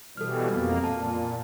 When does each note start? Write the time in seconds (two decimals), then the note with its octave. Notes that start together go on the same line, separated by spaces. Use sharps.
0.17 B2 E3 G3 A4 F6
0.53 F2 A#3
0.84 A#2 A5